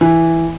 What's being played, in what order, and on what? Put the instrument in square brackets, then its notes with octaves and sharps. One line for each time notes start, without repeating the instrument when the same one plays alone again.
[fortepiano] E3